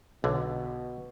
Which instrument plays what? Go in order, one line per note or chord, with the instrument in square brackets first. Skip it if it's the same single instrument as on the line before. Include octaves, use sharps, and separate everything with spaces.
[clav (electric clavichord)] B1 D3 [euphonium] B2